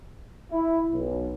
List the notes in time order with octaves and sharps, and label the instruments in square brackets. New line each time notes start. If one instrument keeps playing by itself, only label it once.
[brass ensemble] E4
B1